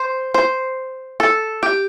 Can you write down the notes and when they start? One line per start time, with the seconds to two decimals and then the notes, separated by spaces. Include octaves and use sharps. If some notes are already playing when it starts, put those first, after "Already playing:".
Already playing: C5
0.34 C5
1.20 A4
1.63 G4